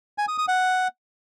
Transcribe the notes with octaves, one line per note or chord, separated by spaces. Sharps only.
G#5
D#6
D#6
F#5